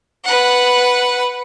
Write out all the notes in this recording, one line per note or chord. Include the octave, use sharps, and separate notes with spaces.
B4 F#5